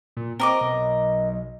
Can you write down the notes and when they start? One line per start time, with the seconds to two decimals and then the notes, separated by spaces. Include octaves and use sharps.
0.17 A#2
0.40 C4 A#4 D#5 D6
0.61 B1